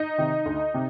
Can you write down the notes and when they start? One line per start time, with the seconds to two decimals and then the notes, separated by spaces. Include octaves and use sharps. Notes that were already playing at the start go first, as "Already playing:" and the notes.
Already playing: D#4 D#5
0.18 C3 D#3
0.46 D2
0.74 C3